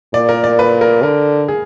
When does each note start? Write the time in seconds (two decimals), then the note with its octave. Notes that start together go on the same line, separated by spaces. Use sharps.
0.14 A#2 D5
0.29 A#4
0.44 D5
0.59 B4
0.81 A#4
1.03 D3 A#4
1.48 G#4